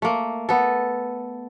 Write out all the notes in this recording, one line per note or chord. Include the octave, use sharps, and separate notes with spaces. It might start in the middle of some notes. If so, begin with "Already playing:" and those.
A3 A#3
B3 A4